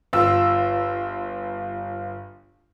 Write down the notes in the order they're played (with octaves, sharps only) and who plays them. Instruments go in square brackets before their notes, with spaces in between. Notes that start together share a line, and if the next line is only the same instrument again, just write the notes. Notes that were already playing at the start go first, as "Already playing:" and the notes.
[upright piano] G1 F4 E6